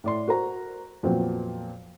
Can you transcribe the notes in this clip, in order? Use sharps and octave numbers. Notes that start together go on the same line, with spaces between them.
A2 D5 C6
F#4 A#4 C5 A#5
F2 A#2 F#3 B3 C4